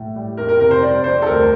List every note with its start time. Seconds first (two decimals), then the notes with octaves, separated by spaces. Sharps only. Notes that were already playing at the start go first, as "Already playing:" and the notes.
Already playing: A2
0.15 G3
0.37 F2 A#4
0.49 A#4
0.59 C3 A#4
0.71 C5
0.82 G3 D5
1.04 F2 C5
1.22 A4
1.26 D2 A#4